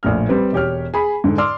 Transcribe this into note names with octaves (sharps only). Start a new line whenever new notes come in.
A#1 A2 F6
G3 C4 B4
E1 G4 C#5 F6
G#4 G#5 B5
G#2 D3
D5 C6 D6 E6 F6